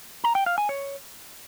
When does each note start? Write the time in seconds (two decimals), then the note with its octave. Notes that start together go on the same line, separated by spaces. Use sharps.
0.24 A#5
0.35 G5
0.46 F5
0.58 G#5
0.69 C#5